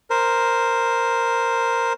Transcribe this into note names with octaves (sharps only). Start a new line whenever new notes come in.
A#4 C5